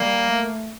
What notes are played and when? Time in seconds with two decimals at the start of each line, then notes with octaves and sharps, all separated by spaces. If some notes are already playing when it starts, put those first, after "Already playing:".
Already playing: G3 A#3
0.29 A3